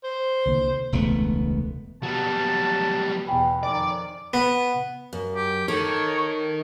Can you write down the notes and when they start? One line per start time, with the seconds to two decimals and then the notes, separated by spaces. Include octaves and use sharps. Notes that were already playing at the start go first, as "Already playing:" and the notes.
0.04 C5
0.46 C2 D3 A#3
0.93 E1 C#2 A3 B3
2.03 F#3 G3 B3 A5
3.27 E2 B2 G5 G#5 B5
3.63 F2 D#3 D5 D6
4.34 B3
5.13 F#2
5.36 G4
5.68 D#3 A4 C#5